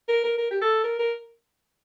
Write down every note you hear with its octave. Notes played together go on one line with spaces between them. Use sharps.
A#4
A#4
A#4
G4
A4
A#4
A#4